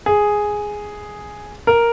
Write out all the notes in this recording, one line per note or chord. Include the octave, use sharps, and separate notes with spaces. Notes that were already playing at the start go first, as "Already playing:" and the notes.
G#4
A#4